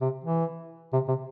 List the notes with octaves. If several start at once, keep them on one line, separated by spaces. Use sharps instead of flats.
C3
E3
C3
C3